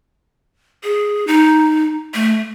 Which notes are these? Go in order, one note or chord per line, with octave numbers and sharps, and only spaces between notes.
G#4
D#4
A3